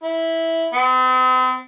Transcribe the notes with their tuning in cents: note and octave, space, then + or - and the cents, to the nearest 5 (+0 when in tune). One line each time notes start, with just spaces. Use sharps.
E4 -10
C4 -40